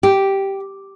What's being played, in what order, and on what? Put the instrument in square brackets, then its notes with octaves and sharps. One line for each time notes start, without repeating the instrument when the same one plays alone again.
[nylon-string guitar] G4